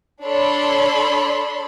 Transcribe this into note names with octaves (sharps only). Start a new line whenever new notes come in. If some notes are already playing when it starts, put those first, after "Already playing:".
D4 A4 C#5 D5 B5 C6